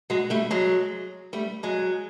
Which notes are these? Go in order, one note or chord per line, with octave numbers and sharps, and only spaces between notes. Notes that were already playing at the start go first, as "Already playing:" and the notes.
F#3 G#3
G3 A3
F#3 G#3
G3 A3
F#3 G#3